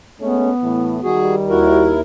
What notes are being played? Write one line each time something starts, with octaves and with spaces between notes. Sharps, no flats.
G#3 A3 B3 C#4
A2 E3
D#3 G3 F#4 G#4
D#2 E4 F#4 A#4